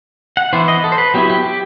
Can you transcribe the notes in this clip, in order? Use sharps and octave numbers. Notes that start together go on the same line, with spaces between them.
F#5
E3 B3 E4 C5
D#5
A4
C5
B4
F#3 B3 E4 G4
G4
G4